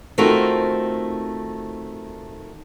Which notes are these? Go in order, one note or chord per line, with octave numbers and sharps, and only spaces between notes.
D#3 A3 C4 F4 F#4 A#4